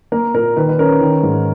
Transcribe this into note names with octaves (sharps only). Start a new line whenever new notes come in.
A#3 A#4
A#2 A#4
D#3 B4
B4
C#4 A#4
D#3
G#2